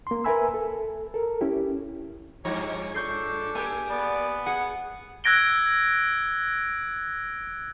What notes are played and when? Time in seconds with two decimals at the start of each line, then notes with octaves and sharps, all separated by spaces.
0.07 A#3 C6
0.24 A#4 B4 E5 G#5 B5 E6
0.54 A4
1.14 A4 A#4
1.41 C#4 E4 G4
2.45 G2 F3 G#3 G4 C#5
2.95 D4 A4 C#6 G6 C7
3.55 A#3 G4 G#4 G#5 G6
3.90 B3 D5
4.46 G#4 F#5
5.24 E6 F#6 G#6 A#6 D7 G7